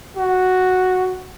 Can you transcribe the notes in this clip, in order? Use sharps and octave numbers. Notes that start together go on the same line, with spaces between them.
F#4